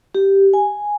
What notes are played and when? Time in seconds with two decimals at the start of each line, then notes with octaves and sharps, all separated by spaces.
0.15 G4
0.54 G#5